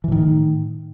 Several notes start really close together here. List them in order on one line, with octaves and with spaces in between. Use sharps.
E3 A2 D#3